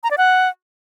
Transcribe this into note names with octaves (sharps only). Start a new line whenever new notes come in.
A#5
D5
F#5